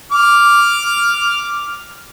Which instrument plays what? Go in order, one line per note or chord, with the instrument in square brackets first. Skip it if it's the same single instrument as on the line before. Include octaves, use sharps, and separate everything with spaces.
[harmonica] D6 F6